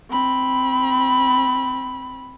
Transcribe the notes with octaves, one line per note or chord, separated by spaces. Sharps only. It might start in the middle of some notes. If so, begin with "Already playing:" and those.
C4 B5